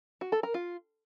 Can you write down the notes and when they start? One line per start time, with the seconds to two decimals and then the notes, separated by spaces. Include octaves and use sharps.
0.21 F#4
0.32 A4
0.43 A#4
0.54 F4